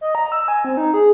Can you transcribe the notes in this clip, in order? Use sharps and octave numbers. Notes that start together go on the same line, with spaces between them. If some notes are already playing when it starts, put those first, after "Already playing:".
D#5
A#5
E6
G#5
C4
D#4
G#4